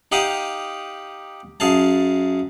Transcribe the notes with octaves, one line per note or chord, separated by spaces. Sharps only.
D#4 G4 F5 F#5 D6 D#6
F#2 G#4 F5 A5